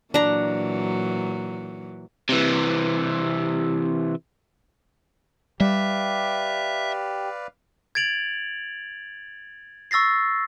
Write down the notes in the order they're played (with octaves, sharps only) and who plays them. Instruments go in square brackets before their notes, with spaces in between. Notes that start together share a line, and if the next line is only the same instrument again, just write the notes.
[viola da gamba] A#2 E3 F#3 [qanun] D4 A#5
[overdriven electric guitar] C3 E3
[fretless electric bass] G3 [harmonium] G4 [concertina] B4 D5 F5 [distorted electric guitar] E5
[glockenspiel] G#6 A6 D7 F7 F#7
C#6 E6 A6 A#6 C7